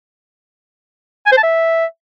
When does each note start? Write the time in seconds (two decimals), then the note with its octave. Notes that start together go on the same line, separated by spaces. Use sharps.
1.26 G#5
1.32 C5
1.38 A5
1.43 E5